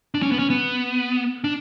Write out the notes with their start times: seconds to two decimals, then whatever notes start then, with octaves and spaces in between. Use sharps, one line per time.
0.14 D4
0.22 C#4
0.32 B3
0.39 C#4
0.50 B3
1.44 D4